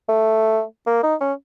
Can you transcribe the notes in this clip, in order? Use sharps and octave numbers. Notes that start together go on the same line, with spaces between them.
A3
A#3
D#4
C#4